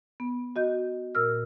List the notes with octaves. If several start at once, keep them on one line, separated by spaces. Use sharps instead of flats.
B3
F#4 D#5 G6
A#2 A#4 E6 F6